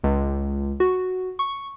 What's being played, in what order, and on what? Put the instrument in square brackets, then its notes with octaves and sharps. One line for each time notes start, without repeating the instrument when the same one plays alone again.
[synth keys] C#2
F#4
C#6